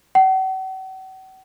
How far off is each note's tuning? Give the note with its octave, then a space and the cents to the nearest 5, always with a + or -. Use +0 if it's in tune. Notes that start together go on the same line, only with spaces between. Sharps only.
F#5 +45